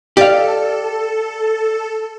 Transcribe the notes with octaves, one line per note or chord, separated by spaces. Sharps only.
G4 A4 D5 F5